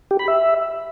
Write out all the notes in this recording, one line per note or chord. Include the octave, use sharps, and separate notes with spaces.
G4
B5
E5